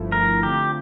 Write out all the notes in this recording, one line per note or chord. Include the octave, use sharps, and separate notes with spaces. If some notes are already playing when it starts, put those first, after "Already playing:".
Already playing: G1 G2 F3 A3 E4
A#4
D3 A3 C4 F4 G4